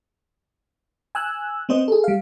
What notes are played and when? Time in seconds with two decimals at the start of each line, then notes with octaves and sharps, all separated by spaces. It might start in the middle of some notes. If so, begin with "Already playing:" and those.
1.15 G#5 E6 F#6
1.69 B3 C4 C5 D#5
1.88 G#4 A4
2.04 G3 F5